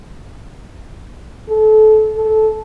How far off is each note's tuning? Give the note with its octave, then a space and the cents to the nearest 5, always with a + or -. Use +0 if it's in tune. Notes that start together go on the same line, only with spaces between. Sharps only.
A4 -25
A4 -15